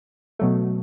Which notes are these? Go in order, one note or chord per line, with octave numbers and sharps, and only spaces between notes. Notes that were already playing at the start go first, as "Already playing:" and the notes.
B2 F#3 A3